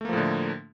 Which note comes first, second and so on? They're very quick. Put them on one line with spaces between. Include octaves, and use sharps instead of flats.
A3 A#3 F3 A2 D3